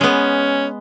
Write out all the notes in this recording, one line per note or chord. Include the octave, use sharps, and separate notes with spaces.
G#3 B3 C#4